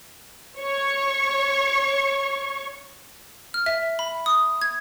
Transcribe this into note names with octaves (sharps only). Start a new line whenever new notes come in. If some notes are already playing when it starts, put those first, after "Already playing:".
C#5 C#6
F6
E5
B5
D#6
G#6